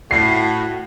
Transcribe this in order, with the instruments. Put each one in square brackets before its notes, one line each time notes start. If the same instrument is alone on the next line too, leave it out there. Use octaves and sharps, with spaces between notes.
[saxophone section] A2 [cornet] F#4 [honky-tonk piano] C7